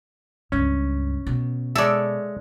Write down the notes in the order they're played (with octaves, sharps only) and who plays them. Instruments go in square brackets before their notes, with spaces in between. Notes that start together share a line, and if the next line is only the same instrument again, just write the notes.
[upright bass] C#2 G2 [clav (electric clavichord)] C#4
[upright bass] B2
[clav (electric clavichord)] G#3 C#5 E5 [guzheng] A4 D5